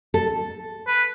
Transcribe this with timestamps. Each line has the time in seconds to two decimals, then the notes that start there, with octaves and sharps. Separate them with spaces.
0.14 A4
0.87 B4